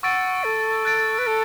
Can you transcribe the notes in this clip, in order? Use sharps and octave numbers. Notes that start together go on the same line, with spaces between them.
F#5 C#6 E6 A6 D7
A4
F#6 A6 D7
B4
A4